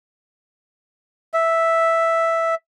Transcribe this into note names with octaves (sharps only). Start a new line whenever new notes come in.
E5